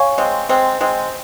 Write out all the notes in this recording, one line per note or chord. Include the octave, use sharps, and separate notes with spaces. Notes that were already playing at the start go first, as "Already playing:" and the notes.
Already playing: C#5 F5 G#5 C#6
G#3 C4
G#3 C4
G#3 C4